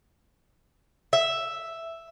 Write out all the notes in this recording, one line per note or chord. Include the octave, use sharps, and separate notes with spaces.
E5